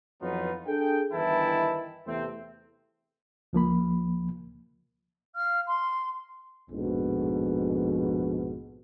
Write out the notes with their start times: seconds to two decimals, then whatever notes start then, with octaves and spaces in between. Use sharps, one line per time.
0.22 F2 E3 F#3 B3 D#4 F4
0.66 D4 G#4 A4 G5
1.13 G1 D#3 E3 E4 G5 A5
2.07 E2 C3 A3 C4
3.53 C#2 F3 A#3 B5
5.35 F5 F6
5.66 C6
6.70 A#1 F2 G#2 B2